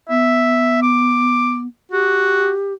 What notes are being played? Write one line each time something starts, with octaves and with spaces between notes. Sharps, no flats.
B3 E5
D6
F#4 G4